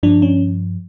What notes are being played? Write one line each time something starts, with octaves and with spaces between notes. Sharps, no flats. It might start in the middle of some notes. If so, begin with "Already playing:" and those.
G2 F3 D4
C#4